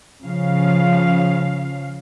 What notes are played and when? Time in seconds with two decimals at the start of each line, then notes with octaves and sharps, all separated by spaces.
0.23 C#3 F3 F5